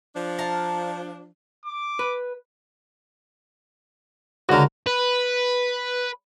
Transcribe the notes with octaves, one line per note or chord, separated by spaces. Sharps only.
F3 D4
F5 A5 A#5
D6
B4
C#2 D3 F#4 A#4
B4